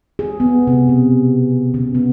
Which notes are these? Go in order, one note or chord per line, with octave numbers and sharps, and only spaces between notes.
G#4
B3
C3
B2
C#3
B3